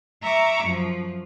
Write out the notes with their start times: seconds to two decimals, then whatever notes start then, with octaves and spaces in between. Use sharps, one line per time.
0.22 E5 A#5 C#6 D6 E6
0.63 F#2 F3